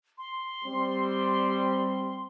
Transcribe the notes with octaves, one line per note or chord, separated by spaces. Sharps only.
C6
G3 C4